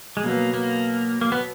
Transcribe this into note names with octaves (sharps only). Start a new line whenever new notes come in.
G#3
B2 F#3 A#3 B3
A#3
A#3
B3